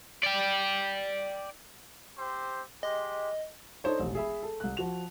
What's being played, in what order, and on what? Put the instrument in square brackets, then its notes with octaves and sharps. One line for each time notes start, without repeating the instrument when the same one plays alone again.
[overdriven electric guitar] D5 G5
[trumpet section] C4 G4 C5
[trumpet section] G#3 G4 C6 [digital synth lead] D#5
[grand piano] D4 D#4 A4 C5 C#5
E1 A1
G#4 E5 B5
A4
C2 F#6
F3 F#4 F7